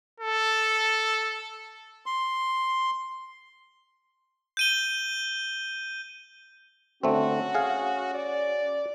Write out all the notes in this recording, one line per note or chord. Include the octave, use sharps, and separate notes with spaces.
A4
C6
G6 D#7 G7
D3 A3 C4 C#4 F#4
G#4 F5
D5